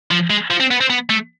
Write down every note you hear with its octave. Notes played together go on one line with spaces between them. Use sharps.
F3
G#3
F3
C4
B3
C4
B3
A3